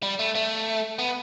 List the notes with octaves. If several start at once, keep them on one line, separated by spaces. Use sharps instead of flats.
G3
A3
A3
B3